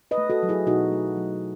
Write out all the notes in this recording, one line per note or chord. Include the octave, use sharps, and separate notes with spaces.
B4 D#5
A3
F#4 A4
F#3
E4 G#4
B2 D#4 F#4
A3
F#3